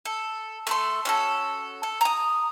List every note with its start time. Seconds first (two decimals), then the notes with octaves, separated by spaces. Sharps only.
0.05 A4
0.67 A3 A4 C6
1.05 C#4 F#4 A4
1.83 A4
2.01 A#5 D#6